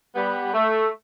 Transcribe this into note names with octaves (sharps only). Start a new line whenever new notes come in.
G3 B3
A3